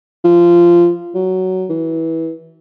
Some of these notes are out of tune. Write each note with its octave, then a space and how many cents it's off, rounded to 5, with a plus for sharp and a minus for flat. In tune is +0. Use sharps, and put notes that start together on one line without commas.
F3 -15
F#3 +10
E3 -20